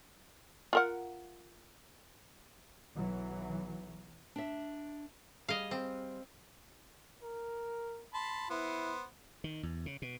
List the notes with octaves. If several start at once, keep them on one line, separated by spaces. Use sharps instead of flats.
F4 A#4 F#5
B1 E3 F#3
D4 E5
G3 G#4 D#5 F5
C4
A#4
A5 B5 C6
B3 E4 C5
D#3
E2
C#3
B2